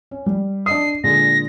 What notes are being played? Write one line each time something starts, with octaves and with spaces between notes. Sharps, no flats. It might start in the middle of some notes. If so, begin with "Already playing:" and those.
C#4
G3
D4 D#5 D#6 C7
A#2 D3 G#3 A#6